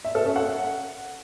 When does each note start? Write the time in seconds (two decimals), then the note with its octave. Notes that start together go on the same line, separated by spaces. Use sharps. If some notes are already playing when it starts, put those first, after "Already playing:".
0.05 E5
0.15 A4
0.25 C#4
0.36 F#5